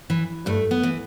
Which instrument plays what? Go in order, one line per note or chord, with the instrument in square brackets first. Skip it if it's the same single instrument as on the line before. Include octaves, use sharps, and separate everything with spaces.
[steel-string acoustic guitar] E3
G2 A3
B3
E3